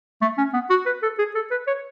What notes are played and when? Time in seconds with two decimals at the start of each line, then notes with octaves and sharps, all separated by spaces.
0.22 A3
0.38 C#4
0.54 B3
0.70 F#4
0.86 B4
1.03 A4
1.19 G#4
1.35 A4
1.51 B4
1.67 C#5